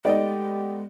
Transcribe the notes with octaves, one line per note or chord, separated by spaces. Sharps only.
G#3 A3 B3 D#4 G4 D5 D#5